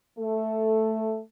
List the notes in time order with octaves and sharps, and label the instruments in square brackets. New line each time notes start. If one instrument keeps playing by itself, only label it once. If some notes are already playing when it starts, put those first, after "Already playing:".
[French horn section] A3 A4